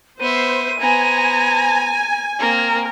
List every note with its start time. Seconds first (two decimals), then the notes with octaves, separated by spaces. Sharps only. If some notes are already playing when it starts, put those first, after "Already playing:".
0.20 B3 C5 E5 D#7
0.80 B3 C5 G#5 A#5
2.39 A#3 C4 A#4